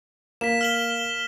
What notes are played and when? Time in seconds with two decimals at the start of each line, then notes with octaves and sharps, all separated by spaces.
0.41 A#3 B6 E7
0.61 F6 F#7 G7